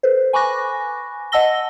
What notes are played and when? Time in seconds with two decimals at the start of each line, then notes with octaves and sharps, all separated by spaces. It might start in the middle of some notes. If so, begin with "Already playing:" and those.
0.03 A4 B4 C5
0.33 G#5 B5 C#6 D6 F#6 A#6
1.32 D#5 F#5 A5 E6 A#6 G7